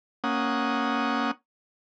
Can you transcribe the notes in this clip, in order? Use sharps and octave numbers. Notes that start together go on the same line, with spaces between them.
A#3 C#4 F#5 D#6